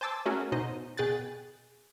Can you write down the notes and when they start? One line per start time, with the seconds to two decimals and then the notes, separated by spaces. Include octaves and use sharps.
0.01 C5 G#5 A5 D6 E6
0.26 A3 C#4 F#4 G#4 A#4
0.52 B2 D#4 C5 D#5
0.97 B2 G#4 G5 F#6 A6